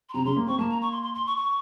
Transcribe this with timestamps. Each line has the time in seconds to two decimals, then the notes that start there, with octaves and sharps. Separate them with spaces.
0.09 C6
0.14 C3 A#5
0.25 C#3 C6
0.36 A#3
0.47 C4 C#6
0.59 A#3 A5
0.70 A#5
0.81 C#6
0.92 C6
1.03 C6
1.14 C6
1.26 C#6
1.37 C#6